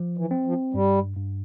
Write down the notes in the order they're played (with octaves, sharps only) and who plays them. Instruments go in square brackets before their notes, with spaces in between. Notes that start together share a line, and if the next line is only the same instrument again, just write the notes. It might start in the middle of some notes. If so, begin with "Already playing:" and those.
Already playing: [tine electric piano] F3
[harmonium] E3
[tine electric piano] C4
[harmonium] F3
[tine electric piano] G2 [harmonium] G3
[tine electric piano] G2